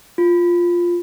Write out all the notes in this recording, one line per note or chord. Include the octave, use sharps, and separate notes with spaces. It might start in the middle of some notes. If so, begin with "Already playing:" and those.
F4